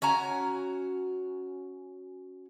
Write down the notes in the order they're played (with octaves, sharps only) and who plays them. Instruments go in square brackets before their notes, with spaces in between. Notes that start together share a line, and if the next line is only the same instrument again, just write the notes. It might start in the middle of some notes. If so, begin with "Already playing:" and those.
[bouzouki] C#4 F#4 G#5 A#5